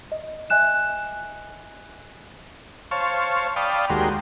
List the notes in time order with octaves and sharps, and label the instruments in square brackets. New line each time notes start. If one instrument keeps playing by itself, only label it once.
[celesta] D#5
D#5 E5 G#5 F#6 E7
[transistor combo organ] C5 C#5 F5 A5 C#6
D5 F5 G5 A5 B5 D#6
D#2 G#3 F#4 G4 A#4 C6